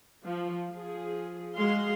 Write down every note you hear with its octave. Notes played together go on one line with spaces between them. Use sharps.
F3
F3 G#4
G#3 F#4 G#4 F5 C6